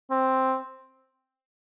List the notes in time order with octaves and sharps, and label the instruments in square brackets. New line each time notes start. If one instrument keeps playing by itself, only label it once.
[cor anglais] C4